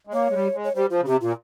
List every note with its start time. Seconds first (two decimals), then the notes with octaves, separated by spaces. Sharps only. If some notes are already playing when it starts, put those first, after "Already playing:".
0.07 G#3
0.13 A#3 C#5
0.29 G#3
0.34 G3
0.54 G#3
0.64 C#5
0.75 G3 C5
0.90 F3 F4
1.01 C#3
1.06 C3 G4
1.21 A#2 F4